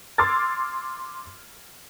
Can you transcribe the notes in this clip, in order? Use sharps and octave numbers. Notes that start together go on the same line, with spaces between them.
C6 D6 E6 F6 G#6 A6